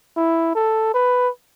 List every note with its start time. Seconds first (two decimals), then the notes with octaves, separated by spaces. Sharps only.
0.17 E4
0.55 A4
0.94 B4